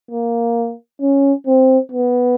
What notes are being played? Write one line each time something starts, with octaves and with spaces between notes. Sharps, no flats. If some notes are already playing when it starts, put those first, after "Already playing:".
A#3
C#4
C4
B3